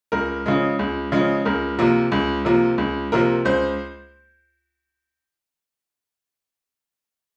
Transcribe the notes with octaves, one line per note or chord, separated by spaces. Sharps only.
C#2 A#4
C#3 F3 G#3
C#2
C#3 F3 G#3
C#2 A#4
C3 F3 A#3
C#2
C3 F3 A#3
C#2
C3 F3 A#3 A#4
C#2 C5